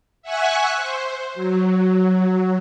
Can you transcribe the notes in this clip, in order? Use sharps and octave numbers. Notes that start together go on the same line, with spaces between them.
E5 F#5 G#5 C#6 F#6
C5
F#3